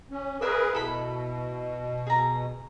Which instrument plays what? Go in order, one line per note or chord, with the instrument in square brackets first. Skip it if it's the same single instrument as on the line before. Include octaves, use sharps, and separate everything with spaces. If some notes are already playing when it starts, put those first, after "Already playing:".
[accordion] C#4
[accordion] G#4 A#4 B4 [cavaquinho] D5 E5 G#5
[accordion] B2 [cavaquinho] E4 A4 B5
[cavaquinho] G#4 A#5